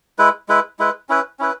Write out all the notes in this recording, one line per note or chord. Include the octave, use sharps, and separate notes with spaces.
G#3 E4 B4
G#3 E4 B4
G#3 E4 B4
C#4 E4 B4
C#4 E4 B4